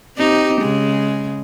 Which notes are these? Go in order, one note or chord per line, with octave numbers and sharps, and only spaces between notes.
C4 D#4 G4
C#3 G#3